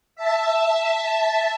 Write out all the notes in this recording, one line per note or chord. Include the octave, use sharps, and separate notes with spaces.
E5 A5